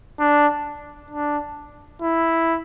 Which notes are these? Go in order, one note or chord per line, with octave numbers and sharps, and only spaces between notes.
D4
D4
E4